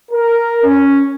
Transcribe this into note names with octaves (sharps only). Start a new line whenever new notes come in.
A#4
C#4